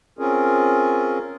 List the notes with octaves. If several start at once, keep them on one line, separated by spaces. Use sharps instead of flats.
C4 C#4 F4 G#4 A#4